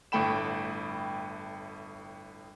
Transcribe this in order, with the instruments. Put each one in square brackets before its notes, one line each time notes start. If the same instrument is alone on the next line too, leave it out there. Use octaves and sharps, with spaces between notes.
[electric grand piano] G1 A2 A3 G5 B5 E7